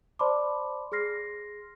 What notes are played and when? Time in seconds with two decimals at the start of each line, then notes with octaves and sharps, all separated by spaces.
0.19 C5 D5 A5 B5 C6 D6
0.92 G#4 C6 F6 A#6 C7